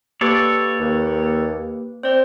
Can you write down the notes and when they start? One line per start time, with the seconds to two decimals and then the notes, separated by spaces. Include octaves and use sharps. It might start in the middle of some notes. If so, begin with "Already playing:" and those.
0.21 A#3 G4 A4 B4 C#5 D5
0.80 D#2
2.03 C4 C5 D5